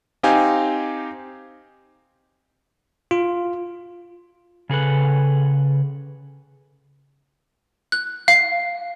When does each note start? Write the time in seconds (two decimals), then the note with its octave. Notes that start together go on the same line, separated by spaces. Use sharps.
0.23 C4 D#4 G4 F5 G#5
3.11 F4
4.69 C#3 G#4 A4 B4
7.92 F#6
8.28 F5